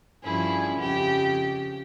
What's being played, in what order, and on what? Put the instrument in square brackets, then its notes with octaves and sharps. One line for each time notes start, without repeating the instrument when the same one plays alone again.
[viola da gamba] G2 F3 C#4 [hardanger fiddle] E4 G#4
[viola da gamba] F2 C#3 [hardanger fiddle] G4